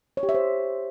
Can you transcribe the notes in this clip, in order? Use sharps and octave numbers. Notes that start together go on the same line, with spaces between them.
C#5
G4
E5
C5